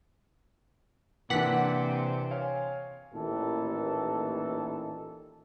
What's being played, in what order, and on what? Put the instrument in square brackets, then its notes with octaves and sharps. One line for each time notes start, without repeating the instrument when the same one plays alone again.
[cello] C3 C5 [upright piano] E3 D4 [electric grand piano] A#3 [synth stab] F#5 B6
[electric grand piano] C#5 F5 G#5
[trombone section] A1 D#2 A#2 D#3 E3 A4